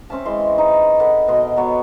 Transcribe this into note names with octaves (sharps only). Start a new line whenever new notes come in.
C4 C#4 E5 A5
E3 G#3 C6
D#4
A4 B4 D#5 F#5
B2 D#5 C6
F#3 B3 C#5